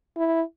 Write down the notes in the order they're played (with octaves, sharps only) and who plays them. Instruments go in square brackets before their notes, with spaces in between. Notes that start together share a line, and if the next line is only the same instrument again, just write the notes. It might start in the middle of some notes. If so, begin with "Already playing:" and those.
[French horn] E4